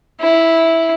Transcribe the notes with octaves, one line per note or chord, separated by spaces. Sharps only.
E4